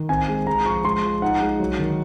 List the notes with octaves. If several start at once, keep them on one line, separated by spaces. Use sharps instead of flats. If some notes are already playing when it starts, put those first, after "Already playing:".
Already playing: D#3
C4 G#5
G#3
G#3 A#5
F3 C#6
G#3 C6
F3
D#4 F#5
G#3
F#3
D#3